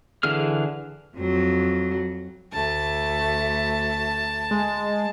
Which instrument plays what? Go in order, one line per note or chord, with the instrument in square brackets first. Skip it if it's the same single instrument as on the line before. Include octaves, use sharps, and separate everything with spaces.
[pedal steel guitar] D3 E3 G#4 F6
[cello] F2 F#3
[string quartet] D2 A3 [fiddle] A5
[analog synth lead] G#3